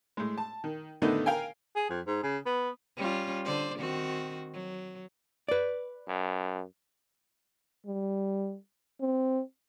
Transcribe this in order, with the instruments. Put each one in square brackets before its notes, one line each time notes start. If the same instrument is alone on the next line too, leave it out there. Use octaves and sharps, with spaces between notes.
[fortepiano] A2 G#3
A5
D#3
A2 D3 D#3 A3 B3 D#4
A#4 F5 G5 G#5
[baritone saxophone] G#4
F2
G#2
C#3
B3
[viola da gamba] G3 C#4 F4
D3 C5 D5
D#3 C4 F#4
F#3
[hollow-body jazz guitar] B4 D5
[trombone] F#2
[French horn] G3
C4